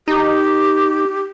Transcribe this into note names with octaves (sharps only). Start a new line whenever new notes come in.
D#4 G4